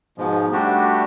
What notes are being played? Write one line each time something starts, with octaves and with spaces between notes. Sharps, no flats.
G#2 B2 F3 G#3
G3 A3 D4 F#4 G4